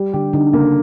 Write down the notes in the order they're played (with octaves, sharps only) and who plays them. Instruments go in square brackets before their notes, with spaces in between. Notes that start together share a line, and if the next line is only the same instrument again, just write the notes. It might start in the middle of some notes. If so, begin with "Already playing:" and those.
Already playing: [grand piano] G3
[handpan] D3 [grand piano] G4
[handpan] D3 [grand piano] D#4
[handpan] C#3 [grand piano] A#3